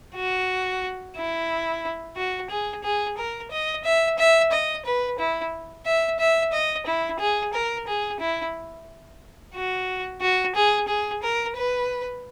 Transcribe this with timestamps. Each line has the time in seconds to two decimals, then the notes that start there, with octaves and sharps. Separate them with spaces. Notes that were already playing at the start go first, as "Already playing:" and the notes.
0.15 F#4
1.16 E4
2.16 F#4
2.50 G#4
2.83 G#4
3.17 A#4
3.51 D#5
3.84 E5
4.18 E5
4.52 D#5
4.85 B4
5.19 E4
5.86 E5
6.19 E5
6.53 D#5
6.86 E4
7.19 G#4
7.53 A#4
7.87 G#4
8.20 E4
9.54 F#4
10.21 F#4
10.55 G#4
10.88 G#4
11.23 A#4
11.56 B4